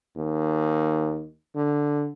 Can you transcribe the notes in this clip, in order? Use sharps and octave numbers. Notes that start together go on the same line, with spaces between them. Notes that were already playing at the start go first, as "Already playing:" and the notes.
D#2
D3